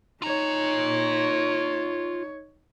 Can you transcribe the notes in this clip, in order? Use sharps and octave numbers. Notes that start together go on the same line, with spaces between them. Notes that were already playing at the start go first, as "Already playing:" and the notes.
D#4 F4 C#5 A#5